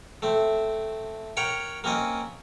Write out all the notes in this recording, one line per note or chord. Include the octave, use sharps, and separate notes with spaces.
A3 C4
A#4 C#5 F#5 G5
A#3 C4 C#4 D#5